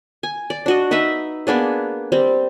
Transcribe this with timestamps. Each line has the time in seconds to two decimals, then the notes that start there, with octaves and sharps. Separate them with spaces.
0.23 G#5
0.50 D5
0.66 D4 F#4 D#5
0.91 D#4 B4 D#5 E5
1.47 A#3 B3 D4 G#4
2.12 G3 C4